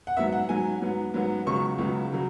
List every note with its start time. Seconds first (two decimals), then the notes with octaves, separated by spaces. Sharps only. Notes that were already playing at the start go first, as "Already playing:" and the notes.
0.07 F#5
0.17 G#2 F#3 B3 E5
0.32 F#5
0.49 G#2 F#3 B3 G#5
0.82 G#2 F#3 B3
1.14 G#2 F#3 B3
1.46 C#2 C#3 F#3 B3 C#6
1.78 C#2 C#3 F#3 B3
2.12 C#3 F#3